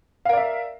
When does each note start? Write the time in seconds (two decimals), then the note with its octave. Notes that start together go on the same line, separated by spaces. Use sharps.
0.25 F5
0.29 A#4
0.33 D5
0.37 E5